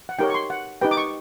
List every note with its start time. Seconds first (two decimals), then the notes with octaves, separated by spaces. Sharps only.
0.09 F#5
0.19 D#4 G4 A#4 C#5 G5
0.30 C#6
0.34 C6
0.50 F#5
0.81 D#4 G4 B4 G5
0.91 D6
0.97 C#6